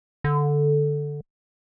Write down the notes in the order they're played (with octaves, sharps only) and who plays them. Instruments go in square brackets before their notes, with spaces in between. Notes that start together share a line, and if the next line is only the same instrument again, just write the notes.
[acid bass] D3